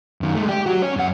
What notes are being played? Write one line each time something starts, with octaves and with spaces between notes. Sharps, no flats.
F#2 D#3
G#3 A3
G4
F#3 F#4
C#4 C#5
F#2 F#5